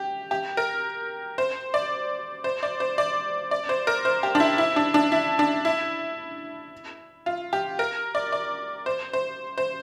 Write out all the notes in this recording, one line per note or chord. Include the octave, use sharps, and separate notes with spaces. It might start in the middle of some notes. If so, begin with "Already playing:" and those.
Already playing: G4
G4
A#4
C5
D5
C5
D5
C5
D5
D5
C5
A#4
C5
G4
D4
E4
E4
D4
D4
E4
D4
E4
F4
G4
A#4
D5
D5
C5
C5
C5